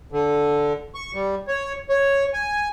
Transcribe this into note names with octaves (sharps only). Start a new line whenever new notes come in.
D3
C#6
G3
C#5
C#5
G#5